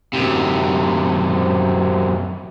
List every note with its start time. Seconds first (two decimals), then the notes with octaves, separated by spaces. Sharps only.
0.13 F#2 C3